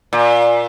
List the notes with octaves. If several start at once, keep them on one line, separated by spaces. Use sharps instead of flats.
A#2